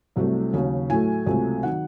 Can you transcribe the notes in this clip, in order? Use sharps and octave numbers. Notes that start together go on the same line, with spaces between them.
C2 C3 F#3 A3
D#2 C#3 F#3
A2 F#3 A3 G#5
C#2 C3 F#3 A3
D#3 F#3 F#5